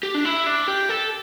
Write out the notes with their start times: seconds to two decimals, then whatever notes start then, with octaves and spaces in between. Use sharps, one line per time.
0.03 G4
0.14 D4
0.25 E4
0.46 D4
0.68 G4
0.89 A4